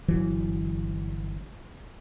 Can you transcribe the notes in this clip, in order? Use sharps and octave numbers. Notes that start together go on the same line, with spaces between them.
G1 E3 F#3